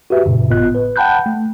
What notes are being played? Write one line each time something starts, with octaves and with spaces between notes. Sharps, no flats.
F#4 G4 B4 E5
F#2 A#2 C#3
G#1 A2 B3 F4 D#5 F#6
B4
F#5 G5 A5 B5 F#6 G6
A3